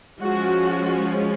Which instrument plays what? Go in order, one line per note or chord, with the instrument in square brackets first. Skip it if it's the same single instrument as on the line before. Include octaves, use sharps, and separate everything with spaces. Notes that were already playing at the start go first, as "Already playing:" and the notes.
[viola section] F3 G#3 C#4 F#4